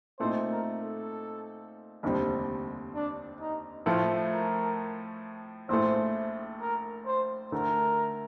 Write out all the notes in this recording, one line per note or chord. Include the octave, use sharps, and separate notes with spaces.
A#2 A3 C4 D#4 C5
A#4
A4
F1 D#2 D3 G3 C4
D4
D#4
A2 F3 A3 F4
A#4
A#1 A2 A3 C5
A#4
C5
D2 D3 A3 A#4